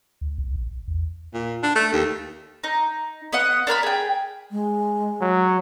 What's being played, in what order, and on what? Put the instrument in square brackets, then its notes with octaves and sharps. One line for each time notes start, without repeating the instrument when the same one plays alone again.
[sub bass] D2
C2
A#1
E2
[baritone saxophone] A#2
D4
A3
D#2
[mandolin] D#4
B3 D#5 F#5
D4 A#4 G#5 B5
G#4 G5
[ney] G#3
[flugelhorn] F#3